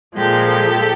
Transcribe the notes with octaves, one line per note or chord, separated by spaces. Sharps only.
A#2 F3 G#3 G4 A4
G4 A4